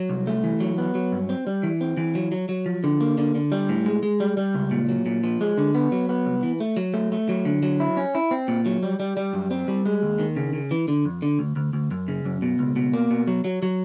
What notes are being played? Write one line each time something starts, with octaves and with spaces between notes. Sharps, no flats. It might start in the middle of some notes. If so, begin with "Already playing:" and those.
Already playing: F#3
C2
A3
E3
F#3
B3
F#3
G2
C4
G3
E3
C4
E3
F#3
F#3
F#3
F3
D3
A#3
D3
D3
G3
A2
G#3
G#3
G3
G3
C#2
A#2
F#3
A#2
F3
G#3
D3
B3
F#3
B3
C2
E3
A3
F#3
A3
A3
F#3
D3
F#3
E4
C#4
E4
C4
A#2
F#3
G3
G3
G3
F#2
C4
G3
G#3
D#2
D#3
C#3
C#3
E3
D3
F2
D3
D2
D2
D2
F#2
C#3
F#2
B2
C#2
B2
A#3
B2
F#3
F#3
F#3